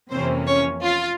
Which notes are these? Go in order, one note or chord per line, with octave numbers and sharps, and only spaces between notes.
F2 C3 E3 A#3 C4 C#4 C5
C#4 C#5
F4 F5